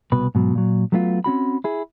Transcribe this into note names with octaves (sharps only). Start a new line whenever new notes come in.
C2 B2 B4
G#2 B2 F#3
A#2 F#3
F#3 A3 B3 D4 F4
C4 C#4 F#4 B5
E4 G#4